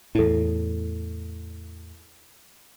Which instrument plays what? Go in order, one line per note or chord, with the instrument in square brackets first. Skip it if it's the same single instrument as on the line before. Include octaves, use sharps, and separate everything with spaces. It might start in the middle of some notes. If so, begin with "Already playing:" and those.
[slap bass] E2 A2 [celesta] E4 A4